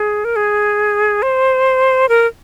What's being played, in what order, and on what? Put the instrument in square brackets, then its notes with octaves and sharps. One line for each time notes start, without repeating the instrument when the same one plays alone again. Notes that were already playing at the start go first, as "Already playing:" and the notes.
Already playing: [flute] G#4
A#4
G#4
C5
A#4